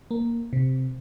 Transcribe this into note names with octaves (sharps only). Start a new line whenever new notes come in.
A#3
C3